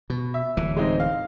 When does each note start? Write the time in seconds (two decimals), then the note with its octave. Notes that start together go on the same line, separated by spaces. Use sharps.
0.10 B2
0.34 E5
0.57 D1 E3
0.76 G#3 C4 D#4
1.00 F5